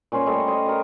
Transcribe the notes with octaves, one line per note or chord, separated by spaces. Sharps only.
A#2 C#4 C5 C#5
G3 A3 C#5 D#5
C5 D#5 C#6
A#4 C#5